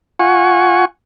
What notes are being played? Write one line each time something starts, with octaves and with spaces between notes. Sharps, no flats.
F4 F#5 G#5 C#6